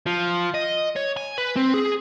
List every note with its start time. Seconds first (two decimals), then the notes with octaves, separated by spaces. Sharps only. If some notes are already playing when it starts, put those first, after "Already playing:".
0.07 F3
0.54 D#5
0.96 C#5
1.17 G#5
1.38 B4
1.57 C4
1.74 G#4